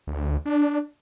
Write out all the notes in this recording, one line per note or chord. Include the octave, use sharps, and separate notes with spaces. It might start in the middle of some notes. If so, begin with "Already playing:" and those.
D2
D4